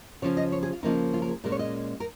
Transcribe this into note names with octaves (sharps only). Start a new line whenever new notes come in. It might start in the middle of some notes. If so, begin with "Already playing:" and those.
C#3 F3 C#4 C#5
D#5
C#5
G#4
F4
C#3 F3 A#3 C#4 D#4
F4
A#4
G#4
A#2 G#3 C#4 A#4
C#5
D#5
A#4